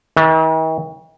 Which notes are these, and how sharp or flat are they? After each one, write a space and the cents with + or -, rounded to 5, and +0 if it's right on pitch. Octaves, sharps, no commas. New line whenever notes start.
D#3 +45